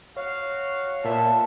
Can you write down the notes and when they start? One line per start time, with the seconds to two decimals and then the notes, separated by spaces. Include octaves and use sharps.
0.16 F#4 C#5 F5
1.04 A#2 B3 E5 A5